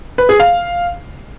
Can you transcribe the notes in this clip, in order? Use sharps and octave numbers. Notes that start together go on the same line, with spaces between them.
B4
G#4
F5